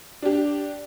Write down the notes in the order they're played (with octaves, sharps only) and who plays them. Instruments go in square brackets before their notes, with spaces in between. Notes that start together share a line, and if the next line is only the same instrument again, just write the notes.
[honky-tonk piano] D4 G4